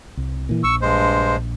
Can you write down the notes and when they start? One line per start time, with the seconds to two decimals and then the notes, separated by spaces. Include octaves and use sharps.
0.17 C2
0.49 A#2 E3
0.63 A#1 C#6 E6
0.81 G2 G#3 C5